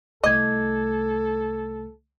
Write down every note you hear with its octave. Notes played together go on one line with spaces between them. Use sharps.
C2 A3 A4 D#5 D6 G#6